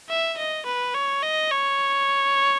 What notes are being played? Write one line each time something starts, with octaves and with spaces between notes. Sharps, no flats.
E5
D#5
B4
C#5
D#5
C#5